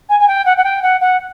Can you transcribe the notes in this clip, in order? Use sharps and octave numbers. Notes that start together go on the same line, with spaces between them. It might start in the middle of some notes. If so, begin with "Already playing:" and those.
G#5
G#5
G5
F#5
F#5
G5
F#5
F#5